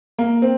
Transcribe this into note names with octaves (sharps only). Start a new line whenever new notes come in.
A#3
C4